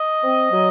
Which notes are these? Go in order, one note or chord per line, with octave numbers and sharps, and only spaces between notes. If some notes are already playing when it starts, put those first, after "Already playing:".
Already playing: D#5
C4
F#3